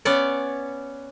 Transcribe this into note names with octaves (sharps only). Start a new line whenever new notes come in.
B3 C#4 C#5 D5